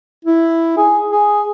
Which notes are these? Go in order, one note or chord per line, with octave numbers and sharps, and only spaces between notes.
E4
G#4
G#4